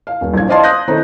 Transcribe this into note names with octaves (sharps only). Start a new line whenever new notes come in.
F5
D#1
A#1 F3 G#6
C5 D5 D#5 F5 A5 C6
D#6 F#6 G6 A#6
D#3 A3 C4 D#4 E4